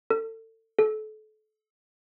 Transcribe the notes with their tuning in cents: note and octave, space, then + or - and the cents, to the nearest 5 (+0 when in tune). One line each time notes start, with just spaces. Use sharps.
A4 +30
A4 -30